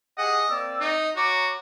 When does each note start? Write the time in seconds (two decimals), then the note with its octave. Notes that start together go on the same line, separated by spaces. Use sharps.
0.18 G4 G#4 D#5 F#5
0.49 A#3 C4 D5 E6
0.81 D#4 D#5
1.16 F#4 C#5 A#5 D6